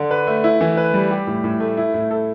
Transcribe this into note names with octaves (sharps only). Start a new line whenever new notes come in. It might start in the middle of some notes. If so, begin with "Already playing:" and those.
Already playing: D3 D4
B4
A3
E4
E3
B4
G3
G4
A2
A2
A3
E4
A2
A4